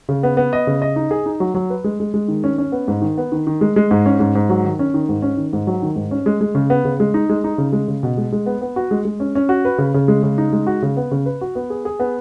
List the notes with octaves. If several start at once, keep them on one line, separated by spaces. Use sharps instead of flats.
C#3
B3
B3
D#5
C#3
D#5
D#4
G#4
D#4
F#3
F#3
B4
G#3
G#3
G#3
D#3
C#4
C#4
B3
G#2
D#3
B3
D#3
D#3
G#3
G#3
G#2
C#4
G#2
G#2
F#3
D#3
C#4
D#3
G#2
C#4
D#3
G#2
F#3
D#3
G#2
C#4
G#3
G#3
C#3
B3
C#3
G#3
D#4
G#3
D#4
C#3
G#3
C#3
B2
G#3
G#3
B3
B3
F#4
G#3
G#3
C#4
C#4
F#4
B4
C#3
C#3
G#3
C#3
D#4
G#3
F#4
C#3
B3
C#3
B4
F#4
B3
G#4
G#4
B3